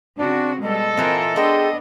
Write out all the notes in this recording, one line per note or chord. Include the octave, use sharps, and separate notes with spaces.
C#3 C4 D4 F#4
B2 G3 G#3 A4 D#5
A#2 E3 C4 D#4 F4 A#4
G#3 B3 D4 D#5 G5